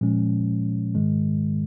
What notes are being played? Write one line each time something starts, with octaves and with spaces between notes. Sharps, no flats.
A#2 F3 G#3 C#4
G#2 D#3 G#3